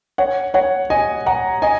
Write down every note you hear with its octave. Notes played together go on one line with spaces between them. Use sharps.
C#5 F#5
C#5 F#5
D#5 G#5
F#5 A#5
D#5 G#5